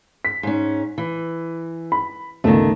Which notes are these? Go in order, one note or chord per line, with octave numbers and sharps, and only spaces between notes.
B6
G#2 C#4
E3
B5
G1 C#2 D#3 A3